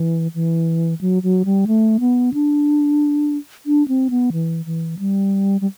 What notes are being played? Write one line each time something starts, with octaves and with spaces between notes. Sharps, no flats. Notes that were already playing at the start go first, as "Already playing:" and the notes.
Already playing: E3
E3
F#3
F#3
G3
A3
B3
D4
D4
C4
B3
E3
E3
G3
G3